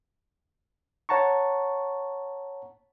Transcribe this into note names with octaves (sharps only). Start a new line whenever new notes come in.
C#5 F#5 A5 A#5 C#6